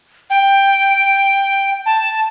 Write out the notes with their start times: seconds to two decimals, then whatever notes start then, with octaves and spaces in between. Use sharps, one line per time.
0.30 G5
1.86 A5